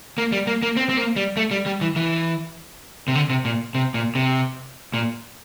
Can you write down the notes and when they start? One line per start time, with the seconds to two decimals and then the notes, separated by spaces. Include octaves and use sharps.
0.18 A#3
0.32 G3
0.47 A#3
0.63 A#3
0.77 C4
0.89 C4
0.97 A#3
1.16 G3
1.37 A3
1.51 G3
1.66 G3
1.81 E3
1.96 E3
3.08 C3
3.15 D3
3.30 C3
3.45 A#2
3.75 C3
3.94 A#2
4.15 C3
4.94 A#2